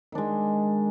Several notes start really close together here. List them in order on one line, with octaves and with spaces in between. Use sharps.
D#3 D4 G#3